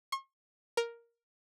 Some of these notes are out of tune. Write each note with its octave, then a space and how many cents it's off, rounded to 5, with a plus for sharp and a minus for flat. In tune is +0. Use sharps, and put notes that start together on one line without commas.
C#6 -45
A#4 +5